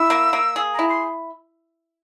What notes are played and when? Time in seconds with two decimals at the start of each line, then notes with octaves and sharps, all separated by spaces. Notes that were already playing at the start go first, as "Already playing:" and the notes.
Already playing: E4 E6
0.10 A#3
0.33 A#3
0.56 G#4
0.74 E4 A#5
0.89 C6